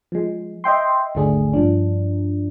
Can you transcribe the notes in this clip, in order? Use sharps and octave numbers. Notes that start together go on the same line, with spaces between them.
F3 G#3
D#5 E5 G5 C6
G#1 D#2 D3 A3 D4 G#4
G2 F3 D4